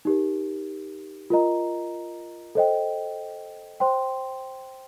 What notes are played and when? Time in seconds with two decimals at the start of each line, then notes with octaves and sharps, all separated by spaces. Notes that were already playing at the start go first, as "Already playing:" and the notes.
0.05 D#4 G4 A#4
1.30 F4 A#4 D#5 A#5
2.55 A4 C5 D#5 G5
3.80 C5 G5 C6